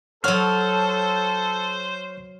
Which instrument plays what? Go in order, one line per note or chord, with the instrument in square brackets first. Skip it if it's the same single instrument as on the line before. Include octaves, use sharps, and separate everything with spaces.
[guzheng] F#3 F#4 [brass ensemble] A4 [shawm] C5 [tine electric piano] C#5 F6